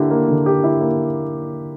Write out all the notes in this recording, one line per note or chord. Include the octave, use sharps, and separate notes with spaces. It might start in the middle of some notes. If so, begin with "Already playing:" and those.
Already playing: D3 A#3 E4 G4
A#3
D3
G4
E4
A#3